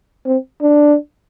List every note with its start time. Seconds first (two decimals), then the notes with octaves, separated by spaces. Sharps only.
0.25 C4
0.62 D4